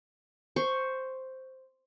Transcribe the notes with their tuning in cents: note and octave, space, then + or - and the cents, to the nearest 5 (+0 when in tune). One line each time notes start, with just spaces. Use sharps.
C5 +0 C#6 +0